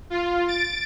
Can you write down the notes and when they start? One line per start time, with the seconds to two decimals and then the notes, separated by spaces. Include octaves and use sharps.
0.10 F4
0.47 A6 D7